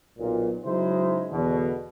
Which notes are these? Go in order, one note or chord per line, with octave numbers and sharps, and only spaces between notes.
B1 A#2
C#3 F#3 G#3 D#4 E4 C5
E2 B2 D3